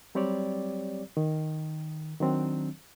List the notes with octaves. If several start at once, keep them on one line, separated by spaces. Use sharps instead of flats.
F#3 G3 C4 G4 C#5 D5
D#3
D#3 F#3 C4 D4